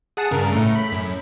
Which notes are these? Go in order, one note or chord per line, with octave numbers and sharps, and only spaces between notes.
G#4 F#5 A5
G2 C#3 A#4
A2 A3
B5
F#2